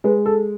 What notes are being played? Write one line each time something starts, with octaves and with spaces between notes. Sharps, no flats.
G#3 B4
A4